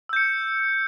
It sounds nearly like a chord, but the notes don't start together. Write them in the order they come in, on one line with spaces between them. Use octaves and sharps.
E6 G6 C#7